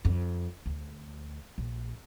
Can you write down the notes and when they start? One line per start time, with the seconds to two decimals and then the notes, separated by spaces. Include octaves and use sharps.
0.05 F2
0.66 D2
1.58 A#1